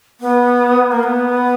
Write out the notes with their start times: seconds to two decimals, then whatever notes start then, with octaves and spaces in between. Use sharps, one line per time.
0.20 B3
0.91 A#3
1.03 B3